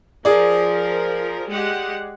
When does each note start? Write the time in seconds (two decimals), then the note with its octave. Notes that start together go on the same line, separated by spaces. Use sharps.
0.25 F3 G#4 A#4 D5
1.48 G#3 G4 F#5